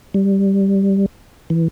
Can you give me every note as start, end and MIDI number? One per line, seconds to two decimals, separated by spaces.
0.14 1.06 55
1.50 1.68 52